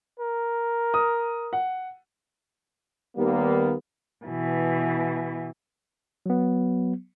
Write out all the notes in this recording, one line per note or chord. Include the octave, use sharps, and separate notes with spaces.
A#4
D#6
F#5
D#2 G3 A#3 B3
B2 E3
F#3 B3